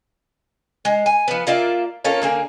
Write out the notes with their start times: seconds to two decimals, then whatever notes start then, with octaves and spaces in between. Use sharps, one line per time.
0.85 G#3
1.06 G#5
1.28 F3 B3
1.47 A#3 F4 D5 E5
2.04 A#3 C#4 F4 A4
2.22 D3 A#3 G#4